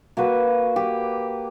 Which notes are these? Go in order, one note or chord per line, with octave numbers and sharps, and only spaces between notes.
A#3 F#4 B4
G4